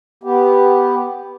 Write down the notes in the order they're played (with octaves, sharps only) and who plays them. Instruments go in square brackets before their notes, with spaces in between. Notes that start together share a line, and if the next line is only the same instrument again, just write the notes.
[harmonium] B3 G4